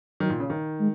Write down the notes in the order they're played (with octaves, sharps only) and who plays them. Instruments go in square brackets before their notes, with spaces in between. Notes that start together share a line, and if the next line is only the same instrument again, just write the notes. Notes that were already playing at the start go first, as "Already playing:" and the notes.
[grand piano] D#3 [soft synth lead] F#3
[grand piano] A#2
C#3
D#3
[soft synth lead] G#3